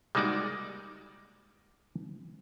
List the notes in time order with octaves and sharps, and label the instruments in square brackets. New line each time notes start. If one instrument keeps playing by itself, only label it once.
[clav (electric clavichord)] G3 G#3 A#3 D#4 F#4 D5